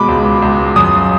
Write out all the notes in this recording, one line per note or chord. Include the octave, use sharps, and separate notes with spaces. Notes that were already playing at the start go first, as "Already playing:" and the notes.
Already playing: B2 G#3 B5 D6
C#2
C#2
F#2 D#6